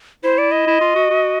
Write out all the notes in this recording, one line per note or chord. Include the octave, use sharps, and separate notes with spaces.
E4 C5
D5
D#5
E4
F4
F#4
F#4